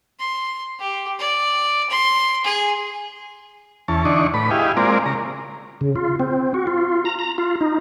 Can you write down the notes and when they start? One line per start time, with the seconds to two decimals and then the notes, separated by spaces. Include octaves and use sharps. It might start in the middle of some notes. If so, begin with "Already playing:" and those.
0.19 C6
0.80 G4
1.19 D5
1.90 C6
2.44 G#4
3.88 E2 C#4 A5
4.05 D3 E3 D4 D#4 C#6
4.34 A2 B4 B5
4.51 E4 G4 G#4 D#5 F5
4.77 G#3 A#3 C4 F4 A#4 D5
5.06 C#3 A#5
5.81 C#3
5.96 F4
6.20 C4
6.54 F#4
6.67 F4
7.05 A#5
7.19 A#5
7.38 F4
7.61 D#4